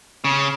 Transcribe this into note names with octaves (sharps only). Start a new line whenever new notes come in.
C#3